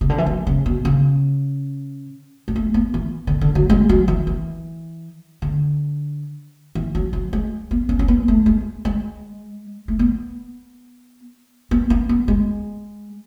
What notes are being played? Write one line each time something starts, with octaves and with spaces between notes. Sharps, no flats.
C#3
D3
E3
F#3
C#3
B2
C#3
G#3
A3
B3
E3
D3
D3
F#3
G#3
F#3
E3
E3
D3
E3
F#3
F#3
G#3
B3
C#4
C#4
B3
A3
G#3
G#3
A3
B3
B3
B3
B3
G#3